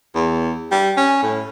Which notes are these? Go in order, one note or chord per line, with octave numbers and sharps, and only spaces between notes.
E2
G3
C#4
A2